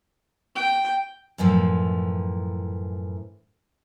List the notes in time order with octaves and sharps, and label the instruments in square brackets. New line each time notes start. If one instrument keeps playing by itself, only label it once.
[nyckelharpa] G5
[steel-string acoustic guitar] F#2 A2 E3 F3